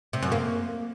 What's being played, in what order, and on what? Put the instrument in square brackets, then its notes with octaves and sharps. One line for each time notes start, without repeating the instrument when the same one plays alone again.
[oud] C3
F#2
A#3